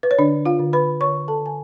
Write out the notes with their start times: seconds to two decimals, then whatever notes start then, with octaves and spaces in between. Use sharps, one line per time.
0.03 B4
0.11 C#5
0.18 D3 D4 D5
0.45 F4 F5
0.59 D3
0.73 B4 B5
1.01 D3 C#5 C#6
1.28 A4 A5
1.41 D3 G#5